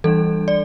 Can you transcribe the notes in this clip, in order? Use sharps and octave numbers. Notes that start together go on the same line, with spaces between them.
E3 G3 D4 A4
D5